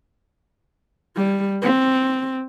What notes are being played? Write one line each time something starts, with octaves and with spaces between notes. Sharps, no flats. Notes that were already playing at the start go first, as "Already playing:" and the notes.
G3
C4